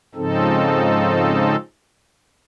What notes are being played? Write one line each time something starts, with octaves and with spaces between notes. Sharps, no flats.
G#2 C#3 F3 C4 D#4 A4